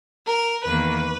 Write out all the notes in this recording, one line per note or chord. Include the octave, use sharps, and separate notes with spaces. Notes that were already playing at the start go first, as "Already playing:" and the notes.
A#4
E2 D#3 A#3 B4